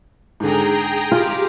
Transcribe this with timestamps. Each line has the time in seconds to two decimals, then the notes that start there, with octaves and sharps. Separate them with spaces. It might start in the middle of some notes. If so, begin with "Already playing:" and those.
0.40 G#2 D3 G#4 G5 A#5
1.12 F4 G4